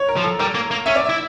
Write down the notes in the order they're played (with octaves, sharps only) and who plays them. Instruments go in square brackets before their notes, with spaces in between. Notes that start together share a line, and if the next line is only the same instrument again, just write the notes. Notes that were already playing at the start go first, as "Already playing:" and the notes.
Already playing: [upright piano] C#5
A#4
[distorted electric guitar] F3
[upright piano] A4
[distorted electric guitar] G3 [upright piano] A#4
[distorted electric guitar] A#3
A#3
[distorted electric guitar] C#4 [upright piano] E5
[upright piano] D5
[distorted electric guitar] E4 [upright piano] E5